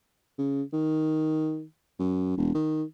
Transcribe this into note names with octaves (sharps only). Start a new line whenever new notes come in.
C#3
D#3
F#2
E1
D#3